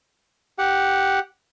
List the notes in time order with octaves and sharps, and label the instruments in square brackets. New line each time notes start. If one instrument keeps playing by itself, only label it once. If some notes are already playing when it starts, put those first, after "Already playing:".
[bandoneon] G4 F#5